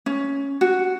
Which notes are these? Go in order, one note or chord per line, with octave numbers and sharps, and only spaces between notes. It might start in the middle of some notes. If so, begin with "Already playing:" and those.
C#4
F#4